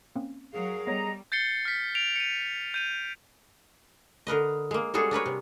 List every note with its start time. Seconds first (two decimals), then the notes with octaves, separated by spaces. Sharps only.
0.15 A#3 C4 C#4
0.53 F#3 G#4 A#4 F5
0.87 G3 B3 A4 C#5 D#5 A#5
1.32 G6 A6 C7 C#7 G7
1.65 F6 B6
1.95 D7 F7
2.16 C#7 D#7
2.74 G6 D#7 F7
4.27 D3 A#4 B4 D#5
4.71 G#3 A#3
4.94 G3 G#3 C#4 F#4 G#4 A4
5.11 D4 A#4 B4 C#5
5.26 C3